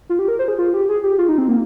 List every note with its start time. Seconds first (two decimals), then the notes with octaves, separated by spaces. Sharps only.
0.09 F4
0.19 G4
0.28 A#4
0.39 C5
0.48 G#4
0.59 F4
0.74 G4
0.89 G#4
1.03 G4
1.18 F4
1.29 D#4
1.38 C4
1.48 A#3